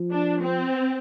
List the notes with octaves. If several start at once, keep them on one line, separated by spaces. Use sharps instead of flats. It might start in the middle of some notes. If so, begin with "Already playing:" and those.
Already playing: F3
D4
C4